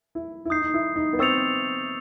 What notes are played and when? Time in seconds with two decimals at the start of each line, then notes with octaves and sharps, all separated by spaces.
0.15 E4
0.45 E4
0.50 D#4 D#6 G6 C7
0.62 D#4
0.74 E4
0.96 D#4
1.13 B3
1.19 C4 C#6 E6 A6 C#7 F7